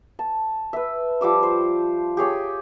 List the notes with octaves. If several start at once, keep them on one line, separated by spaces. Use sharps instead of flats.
A5
B4 E5
F3 G3 D6 E6
C5
G4 G#4 C#5 G5